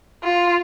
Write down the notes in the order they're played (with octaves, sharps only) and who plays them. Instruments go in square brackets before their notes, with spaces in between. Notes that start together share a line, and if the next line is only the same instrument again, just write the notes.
[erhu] F4